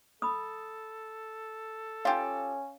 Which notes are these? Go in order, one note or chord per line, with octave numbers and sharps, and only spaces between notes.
A4 B5 D#6
C#4 F4 G4 F5